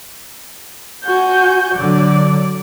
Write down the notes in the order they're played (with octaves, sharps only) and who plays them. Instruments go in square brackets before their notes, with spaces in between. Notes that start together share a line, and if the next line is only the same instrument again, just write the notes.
[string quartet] F#4 G#5 G6
[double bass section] D3 F#3 [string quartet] D5